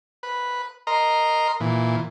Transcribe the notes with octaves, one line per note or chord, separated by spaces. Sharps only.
B4
A#4 D#5 A#5 C6
A#2 E3